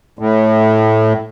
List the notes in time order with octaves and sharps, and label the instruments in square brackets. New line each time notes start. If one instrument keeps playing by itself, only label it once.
[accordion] A2